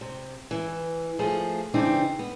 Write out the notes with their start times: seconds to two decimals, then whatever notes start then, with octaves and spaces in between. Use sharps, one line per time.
0.01 C3
0.51 E3
1.19 F3 A3 G#4
1.74 C#3 E3 C4 D4 D#4
2.19 B3